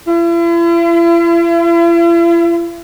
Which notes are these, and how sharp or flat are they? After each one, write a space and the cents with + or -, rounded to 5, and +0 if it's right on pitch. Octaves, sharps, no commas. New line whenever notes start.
E4 +45